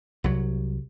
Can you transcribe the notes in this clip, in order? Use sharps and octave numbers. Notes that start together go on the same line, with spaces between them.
C2 F#3